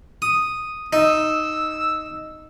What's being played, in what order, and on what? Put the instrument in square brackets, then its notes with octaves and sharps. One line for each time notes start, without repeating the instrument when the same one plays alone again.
[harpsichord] D#6
[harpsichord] D#4 [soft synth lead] E6